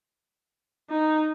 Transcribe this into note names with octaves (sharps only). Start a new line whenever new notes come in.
D#4